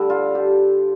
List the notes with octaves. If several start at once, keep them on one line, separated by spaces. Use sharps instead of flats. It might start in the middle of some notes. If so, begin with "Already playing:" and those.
Already playing: D3 G3 D4 A4
F4
G4